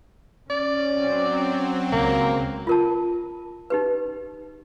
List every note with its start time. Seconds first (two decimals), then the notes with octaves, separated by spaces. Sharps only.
0.50 C#4 D5
0.91 F#3 C4
1.92 C#2 A#3
2.67 F4 A#4 A5
3.70 D#4 G4 B4